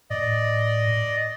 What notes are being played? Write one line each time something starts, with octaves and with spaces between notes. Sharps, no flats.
A2 D5 D#5